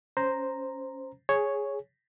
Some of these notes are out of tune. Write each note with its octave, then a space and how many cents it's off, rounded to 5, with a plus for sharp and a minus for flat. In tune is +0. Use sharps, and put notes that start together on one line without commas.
C#4 +0 C5 +0 A#5 +0
G#4 +0 C#5 +0